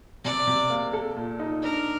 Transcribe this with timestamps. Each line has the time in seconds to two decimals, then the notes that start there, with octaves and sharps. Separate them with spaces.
0.24 C3 D5
0.47 C3
0.70 A#3
0.93 A4
1.16 A#2
1.40 D#4
1.63 D4 A#4